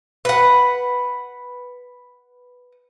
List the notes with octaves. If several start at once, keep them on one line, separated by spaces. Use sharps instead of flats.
B4 F#5